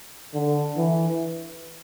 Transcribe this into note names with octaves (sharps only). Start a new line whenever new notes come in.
D3
E3